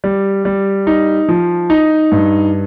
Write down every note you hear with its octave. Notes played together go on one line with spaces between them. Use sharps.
G3
G3
D#4
F3
D#4
G2